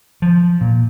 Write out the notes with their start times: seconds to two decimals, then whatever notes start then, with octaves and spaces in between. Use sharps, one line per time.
0.22 F3
0.61 A#2